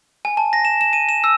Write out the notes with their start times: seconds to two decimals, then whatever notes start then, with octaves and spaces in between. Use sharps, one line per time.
0.25 G#5
0.37 A5
0.53 A#6
0.65 E7
0.81 E7
0.93 D#7
1.09 E7
1.24 E6